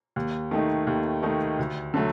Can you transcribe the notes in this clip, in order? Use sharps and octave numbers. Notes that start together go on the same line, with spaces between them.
D#2
D#3 A3 D#4
D#2
D#3 A3 D#4
D2
D3 F#3 A3